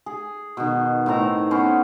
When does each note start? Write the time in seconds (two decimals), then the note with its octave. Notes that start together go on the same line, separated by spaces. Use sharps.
0.06 G#4
0.57 B2 D#3
1.06 A2 D#3 C4 A#5
1.51 B3 C#4 C5